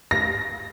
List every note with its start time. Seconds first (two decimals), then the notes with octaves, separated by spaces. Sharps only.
0.11 A#6